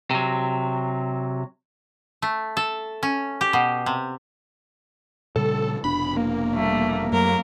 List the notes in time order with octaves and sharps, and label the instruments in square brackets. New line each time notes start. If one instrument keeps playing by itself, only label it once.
[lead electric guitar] C3 F#3
[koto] A3
A4
C#4
G4
B2
C3
[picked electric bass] A#2 C#3 G3 [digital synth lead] A4
[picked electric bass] F1 B2 D4 [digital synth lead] B5
[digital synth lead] A#3
[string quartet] G3 A3
[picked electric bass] F#2 A3 [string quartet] F#3 A#4